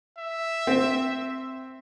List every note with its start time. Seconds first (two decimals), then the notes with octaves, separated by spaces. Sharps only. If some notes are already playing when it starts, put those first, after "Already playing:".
0.18 E5
0.67 C4